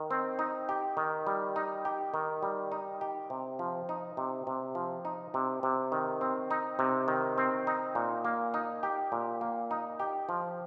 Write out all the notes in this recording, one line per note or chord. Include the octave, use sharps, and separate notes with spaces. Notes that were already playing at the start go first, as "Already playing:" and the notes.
Already playing: D#3
C4
D#4
G4
D#3
G3
D#4
G4
D#3
G3
D#4
G4
C3
F3
D#4
C3
C3
F3
D#4
C3
C3
D#3
C4
D#4
C3
D#3
C4
D#4
A#2
A#3
D#4
G4
A#2
A#3
D#4
G4
F3